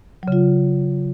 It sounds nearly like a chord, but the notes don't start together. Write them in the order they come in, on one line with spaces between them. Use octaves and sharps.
F#3 C#3 F4